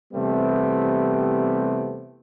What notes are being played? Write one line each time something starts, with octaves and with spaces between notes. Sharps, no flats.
E2 C3 G3 A3 B3 C4